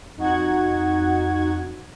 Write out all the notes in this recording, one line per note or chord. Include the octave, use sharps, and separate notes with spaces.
F2 D#4 F#4 F#5 G#6